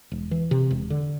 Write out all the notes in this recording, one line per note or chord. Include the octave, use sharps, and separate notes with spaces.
E1
E3
C3
E1
D3